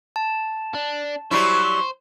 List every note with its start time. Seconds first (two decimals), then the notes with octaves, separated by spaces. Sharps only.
0.16 A5
0.74 D4
1.31 F#3 G3 E4 C5 C#6